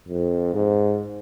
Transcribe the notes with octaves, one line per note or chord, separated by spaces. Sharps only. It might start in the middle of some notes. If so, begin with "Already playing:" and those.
F2
G#2